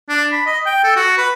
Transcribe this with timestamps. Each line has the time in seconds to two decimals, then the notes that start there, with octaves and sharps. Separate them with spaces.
0.09 D4
0.32 B5
0.46 D#5
0.66 G5
0.84 A4
0.96 F#4
1.18 B4